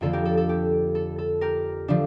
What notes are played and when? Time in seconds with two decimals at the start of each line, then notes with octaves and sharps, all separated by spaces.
0.01 F2 D3 F3 A#3 F4 A4
0.13 G4 A#4
0.25 A4
0.37 A4
0.49 G4
0.95 A4
1.18 A4
1.41 G4 A#4
1.88 D3 F3 A3 D4